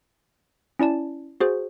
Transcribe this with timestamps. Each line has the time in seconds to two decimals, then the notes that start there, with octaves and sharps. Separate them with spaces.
0.79 C#4 E4 D5 A5
1.40 F#4 G#4 C5